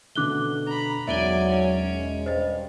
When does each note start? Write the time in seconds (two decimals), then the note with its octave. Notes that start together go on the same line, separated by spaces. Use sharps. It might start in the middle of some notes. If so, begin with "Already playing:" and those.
0.15 B2 D3 A3 D6 F#6 G7
0.67 A#5 B5
1.07 E1 B1 F#3 D5 E5 G#5 D7 G7
1.50 C#4
1.92 G#3
2.26 G2 C5 D#5